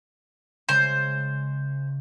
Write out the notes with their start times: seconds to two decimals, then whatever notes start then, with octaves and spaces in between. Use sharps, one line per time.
0.69 C#3 G#3 C5